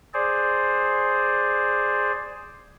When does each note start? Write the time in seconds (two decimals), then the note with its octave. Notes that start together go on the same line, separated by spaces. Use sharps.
0.14 G#4 C5 D5